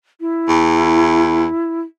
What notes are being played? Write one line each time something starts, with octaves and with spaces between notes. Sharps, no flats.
E4
E2